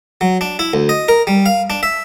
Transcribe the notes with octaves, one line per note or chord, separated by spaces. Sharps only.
F#3
D4
E4
D2
D#5
A#4
G3
F5
D4
E5